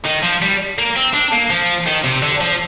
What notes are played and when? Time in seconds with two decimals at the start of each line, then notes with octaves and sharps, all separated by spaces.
0.06 D#3
0.23 F3
0.42 G3
0.78 A#3
0.96 C4
1.14 D4
1.33 A#3
1.51 F3
1.87 D#3
2.04 C3
2.22 D3
2.41 F3